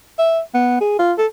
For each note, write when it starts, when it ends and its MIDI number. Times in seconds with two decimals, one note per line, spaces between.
0.19 0.40 76
0.54 0.77 59
0.81 0.98 68
0.99 1.13 65
1.18 1.26 69